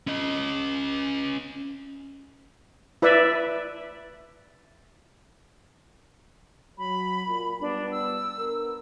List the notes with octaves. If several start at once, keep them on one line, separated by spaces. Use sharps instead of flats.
C#4 D#5
E4 B4 D5 E5
F#3 B5
A#2
G3 B3 D4
E6
B3 D4 A#4